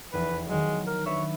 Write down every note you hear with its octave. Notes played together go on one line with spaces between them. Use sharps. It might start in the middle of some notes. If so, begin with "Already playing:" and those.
F1 E2 E3 B4
D#3 F#3 G#3
A#4
D4 B4 C#5 E5